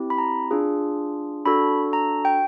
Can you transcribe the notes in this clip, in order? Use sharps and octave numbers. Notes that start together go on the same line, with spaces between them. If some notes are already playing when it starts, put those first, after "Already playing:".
Already playing: C4 E4 G4
B5
A#5
D4 F4 G#4
D4 F#4 A4 B5
A#5
G5